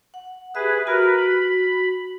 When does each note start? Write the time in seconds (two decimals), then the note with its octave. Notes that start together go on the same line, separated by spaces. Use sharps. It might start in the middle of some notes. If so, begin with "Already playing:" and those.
0.14 F#5
0.55 G4 G#4 B4 E5
0.87 F#4 A#4 B4
1.17 B5